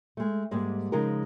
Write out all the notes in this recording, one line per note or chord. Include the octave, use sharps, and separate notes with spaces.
G#3 A3
G#2 G3 G#3 A#3
C#3 F3 G#3 D#4 G#4 A#4